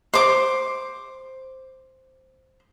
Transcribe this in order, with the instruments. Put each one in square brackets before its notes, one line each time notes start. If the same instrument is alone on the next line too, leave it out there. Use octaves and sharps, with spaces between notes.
[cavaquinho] C5 D6